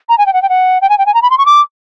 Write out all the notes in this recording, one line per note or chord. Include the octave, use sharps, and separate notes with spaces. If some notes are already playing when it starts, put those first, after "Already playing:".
A#5
G#5
G5
F#5
G5
F#5
G5
G#5
G5
G#5
A#5
B5
C6
C#6
D6